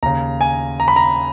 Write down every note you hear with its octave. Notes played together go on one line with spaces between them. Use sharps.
D#2 C#3 A#5
G#5
A#5
B5
A#5